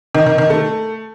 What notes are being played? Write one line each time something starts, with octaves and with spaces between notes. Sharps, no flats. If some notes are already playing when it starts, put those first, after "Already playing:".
D#3
D#3
D#3
A3